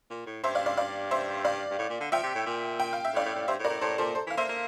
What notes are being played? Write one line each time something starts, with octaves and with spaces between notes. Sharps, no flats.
A#2
A2
G2 C5 E5
D5 F5
D5 F5
D5 F5
C5 E5
D5 F5
G2
A2
A#2
D3
F3 E5 G5
C3
A2
A#2
G5
F5
E5
A2 D5 F5
A2
A2
G2 C5 E5
A2
A#4 D5
A2
A2 A4 C5
A#2 A4 C5
A4 C5
E3 F5
A#3 C5 E5
A#3